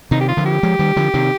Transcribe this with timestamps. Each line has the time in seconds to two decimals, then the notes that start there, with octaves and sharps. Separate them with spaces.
0.11 C3 D#3 D#4
0.21 G4
0.28 F4
0.37 D3 F3
0.46 G4
0.63 F3 G#3
0.79 D#3 G3
0.96 D3 F3
1.14 C3 D#3